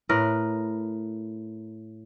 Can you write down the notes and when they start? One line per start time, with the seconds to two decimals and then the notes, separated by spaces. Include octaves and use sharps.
0.09 A2 A#4 B4